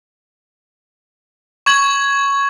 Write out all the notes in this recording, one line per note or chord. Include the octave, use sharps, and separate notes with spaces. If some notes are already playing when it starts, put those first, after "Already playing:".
C#6 G#6 F#7